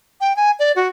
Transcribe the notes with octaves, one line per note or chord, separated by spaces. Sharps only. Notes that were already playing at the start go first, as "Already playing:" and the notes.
G5
G#5
D5
F#4